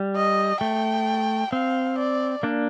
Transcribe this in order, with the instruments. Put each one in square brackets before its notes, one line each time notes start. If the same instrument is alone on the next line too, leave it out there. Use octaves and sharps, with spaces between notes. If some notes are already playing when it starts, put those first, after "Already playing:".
Already playing: [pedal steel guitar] G3
[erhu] D#5
[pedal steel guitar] A3 [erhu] G5
[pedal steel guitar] C4 [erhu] F5
[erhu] D5
[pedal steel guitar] A#3 D4